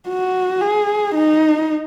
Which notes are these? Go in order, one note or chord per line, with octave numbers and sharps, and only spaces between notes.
F#4
G#4
D#4